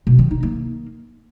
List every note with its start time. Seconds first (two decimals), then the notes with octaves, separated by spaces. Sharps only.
0.07 B2
0.19 D#3
0.31 D#4
0.43 A#3